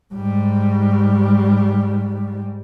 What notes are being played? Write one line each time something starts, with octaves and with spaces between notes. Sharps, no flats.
G#2 G3